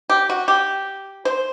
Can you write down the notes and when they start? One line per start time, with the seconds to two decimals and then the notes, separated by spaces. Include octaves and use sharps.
0.10 G4
0.29 F#4
0.48 G4
1.25 C5